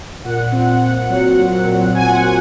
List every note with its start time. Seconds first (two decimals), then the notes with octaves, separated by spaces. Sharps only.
0.24 A#2 F#5
0.52 C4
0.81 A#2
1.09 F#3
1.37 A#2
1.66 A#2
1.94 A#2 G#5
2.08 F#5
2.22 A#2 G#5